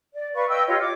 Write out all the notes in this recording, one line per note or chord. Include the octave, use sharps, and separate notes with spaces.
D5
B4 D5 F5 C#6
B4 D#5 G5 E6
F4 G4 C#5 D#5
D6